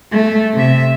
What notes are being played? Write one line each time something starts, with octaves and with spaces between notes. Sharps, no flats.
A3
C3 E5